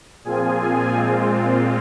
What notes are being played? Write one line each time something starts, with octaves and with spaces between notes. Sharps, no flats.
A#2 F3 C4 F4 G#4 G#5
A#2 G#3 C4 F4